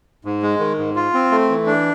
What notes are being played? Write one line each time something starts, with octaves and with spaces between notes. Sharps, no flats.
G#2
G#3
D#3
G#2
F4
C4
A3
E3
D4